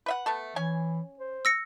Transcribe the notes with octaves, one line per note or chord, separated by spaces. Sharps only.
B4 E5 F#5
A3 B3 A4
E3 C#4 G#5
C5
E6 A#6 C#7